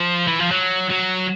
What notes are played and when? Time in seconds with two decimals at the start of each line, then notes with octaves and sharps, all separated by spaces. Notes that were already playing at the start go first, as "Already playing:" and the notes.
Already playing: F3
0.27 E3
0.39 F3
0.51 F#3
0.90 F#3